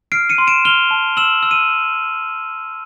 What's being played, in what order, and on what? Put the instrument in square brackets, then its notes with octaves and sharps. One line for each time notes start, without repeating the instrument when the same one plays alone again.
[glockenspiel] F6 C7 D7
C#7 D#7
C6
D7 E7
F6 F7 G7
A5
E6 E7 F#7
E6
D#7